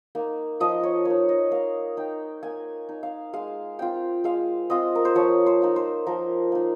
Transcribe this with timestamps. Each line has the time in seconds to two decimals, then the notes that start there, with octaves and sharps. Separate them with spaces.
0.15 A#3 D#4
0.60 F3 D#5
0.83 C#5
1.05 A#3 D#4 C#5
1.29 D#5
1.51 A#3 F5
1.97 D#4 G5
2.43 A#3 G#5
2.89 D#4
3.03 F5
3.33 G#3 F5
3.79 C4 F4 G5
4.24 G#3 F5
4.70 C4 F4 D#5
4.95 A#4
5.05 C5
5.15 F3 C#5
5.46 C5
5.62 A#3 D#4
5.76 C5
6.07 F3 A#4
6.52 A#3 D#4